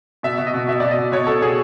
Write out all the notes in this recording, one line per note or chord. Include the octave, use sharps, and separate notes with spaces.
B2 E5
B2
D#5
B2
B2 E5
B2 D5
D#5
B2
B2 C#5
B2 A4
B2 G#4